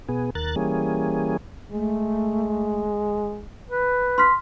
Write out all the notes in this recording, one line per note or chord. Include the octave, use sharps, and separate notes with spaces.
B2 B3 G#4
D#2 A#4 F#6 A6
E3 G3 A#3 C#4 G#4
G#3 A3
B4
C6 F6 B6